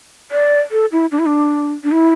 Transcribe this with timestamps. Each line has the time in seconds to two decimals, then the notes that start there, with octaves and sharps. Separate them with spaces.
0.31 D5
0.71 A4
0.92 E4
1.12 D4
1.19 E4
1.26 D4
1.84 D4
1.92 E4